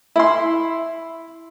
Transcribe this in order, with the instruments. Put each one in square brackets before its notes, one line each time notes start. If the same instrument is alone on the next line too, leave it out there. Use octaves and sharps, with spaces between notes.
[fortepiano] E4 C6